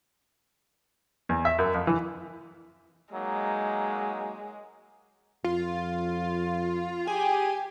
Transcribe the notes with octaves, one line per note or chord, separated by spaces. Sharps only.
E2
E5
F#2
F2
E3
F#3 G#3 A#3 D#4
F2 F4
G4 G#4 G#5